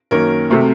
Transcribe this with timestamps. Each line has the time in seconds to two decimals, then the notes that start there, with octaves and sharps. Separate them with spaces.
0.11 F#2 D#3 A#3 C#4 A#4
0.50 C3 F#3 A3 C4